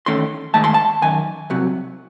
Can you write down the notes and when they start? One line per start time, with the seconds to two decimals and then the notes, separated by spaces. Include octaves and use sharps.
0.06 E2 D#3 A3 C#4 C6
0.54 G#2 D#3 A3 A5
0.64 C6
0.74 A5
1.02 F#2 D#3 G#5
1.50 C2 C3 F#3